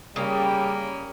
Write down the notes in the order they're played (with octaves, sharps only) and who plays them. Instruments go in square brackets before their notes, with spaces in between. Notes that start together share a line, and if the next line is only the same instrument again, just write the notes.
[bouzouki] C#3 [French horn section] G3 [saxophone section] A#3 C#4 A#4